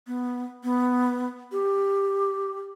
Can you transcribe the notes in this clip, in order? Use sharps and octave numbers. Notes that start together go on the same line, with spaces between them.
B3
B3
G4